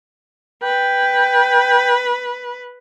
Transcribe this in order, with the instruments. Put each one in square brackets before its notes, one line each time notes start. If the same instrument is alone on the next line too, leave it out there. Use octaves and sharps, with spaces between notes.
[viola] B4 [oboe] G5